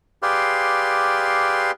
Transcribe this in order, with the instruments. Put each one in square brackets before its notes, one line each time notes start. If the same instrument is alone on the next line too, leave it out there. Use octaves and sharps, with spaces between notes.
[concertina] G4 G#4 B4 D5 F5 C6